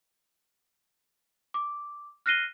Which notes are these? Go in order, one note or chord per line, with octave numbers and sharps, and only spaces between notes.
D6
F6 F#6 A#6 C7 D#7 G7